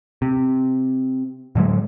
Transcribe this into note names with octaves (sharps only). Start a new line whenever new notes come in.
C3
A2 D3 F#3 G#3